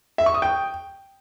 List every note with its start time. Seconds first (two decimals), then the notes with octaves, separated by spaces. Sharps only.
0.18 E5
0.26 C#6
0.34 D#6
0.42 G5